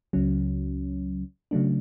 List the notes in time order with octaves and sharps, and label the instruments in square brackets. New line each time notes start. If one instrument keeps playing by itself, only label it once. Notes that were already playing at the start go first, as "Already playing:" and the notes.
[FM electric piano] C#2 C#3 F#3 C#4
C#3 F#3 A3 D4